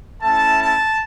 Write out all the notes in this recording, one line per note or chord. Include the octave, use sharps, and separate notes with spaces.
A3 C#4 E4 A5
A5